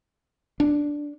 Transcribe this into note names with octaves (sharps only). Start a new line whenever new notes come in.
D4